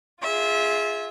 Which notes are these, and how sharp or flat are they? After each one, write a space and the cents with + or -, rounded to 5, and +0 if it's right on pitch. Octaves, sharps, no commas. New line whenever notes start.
F4 +0 G#4 +0 E5 -25